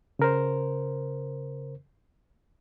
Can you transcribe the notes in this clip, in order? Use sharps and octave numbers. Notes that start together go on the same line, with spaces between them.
C#3 A#4 C5